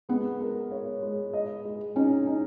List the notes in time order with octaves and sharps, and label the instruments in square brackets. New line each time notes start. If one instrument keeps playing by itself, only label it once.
[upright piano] G#3 [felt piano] B3
[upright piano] A#4
C#5
G#3
D#5
G#3
[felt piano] C#4 [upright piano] D#4
[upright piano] D#4